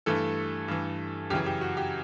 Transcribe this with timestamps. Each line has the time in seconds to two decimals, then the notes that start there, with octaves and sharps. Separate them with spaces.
0.06 G2 E3 A3 A4
0.68 G2 E3
1.30 F#2 C#3 E3 G4
1.46 G4
1.61 F#4
1.77 G4